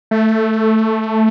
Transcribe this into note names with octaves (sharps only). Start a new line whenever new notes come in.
A3